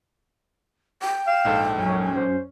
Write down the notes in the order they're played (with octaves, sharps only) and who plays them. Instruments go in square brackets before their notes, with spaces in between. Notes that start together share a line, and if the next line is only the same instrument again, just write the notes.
[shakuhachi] G5
[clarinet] F5 [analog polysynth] E7
[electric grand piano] A#1 G#2 A4
[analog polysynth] F#2 C#4 [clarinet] F#3
[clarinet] C5